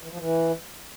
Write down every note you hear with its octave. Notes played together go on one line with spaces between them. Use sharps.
E3
F3
E3